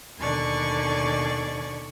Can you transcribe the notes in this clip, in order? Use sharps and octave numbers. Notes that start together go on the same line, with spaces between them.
D#2 B2 D3 D5 G#5 C#6